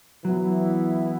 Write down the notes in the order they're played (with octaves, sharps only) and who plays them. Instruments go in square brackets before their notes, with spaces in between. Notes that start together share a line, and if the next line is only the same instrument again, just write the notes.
[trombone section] E3 B3 E4 [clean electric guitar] F#3